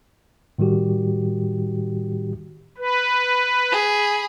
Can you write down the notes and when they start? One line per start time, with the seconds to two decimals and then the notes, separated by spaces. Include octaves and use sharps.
0.58 A2 D#3 G3 F#4 G4
2.78 B4
3.72 G#4 B5